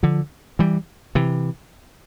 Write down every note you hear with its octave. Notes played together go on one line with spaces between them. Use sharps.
D3 F3
E3 G3
C3 E3